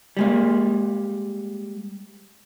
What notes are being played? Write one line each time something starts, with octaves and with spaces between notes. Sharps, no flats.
G3 G#3 A#3